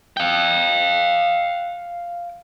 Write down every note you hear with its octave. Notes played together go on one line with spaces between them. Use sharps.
F5 G5